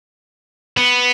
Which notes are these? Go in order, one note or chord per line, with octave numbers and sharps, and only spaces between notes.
B3